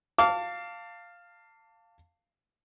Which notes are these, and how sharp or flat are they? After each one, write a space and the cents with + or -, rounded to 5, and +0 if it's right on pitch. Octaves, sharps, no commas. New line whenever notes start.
F5 +0 A5 +25 D6 -30